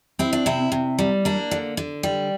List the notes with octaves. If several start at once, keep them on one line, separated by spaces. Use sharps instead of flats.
C4 E4
D4
C3 E4
C3
G3
A#3 D4
D3
D3
G3